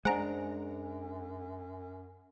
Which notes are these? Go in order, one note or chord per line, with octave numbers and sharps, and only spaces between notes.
F#2 G#3 D4 C5 F#5 G#5 A#5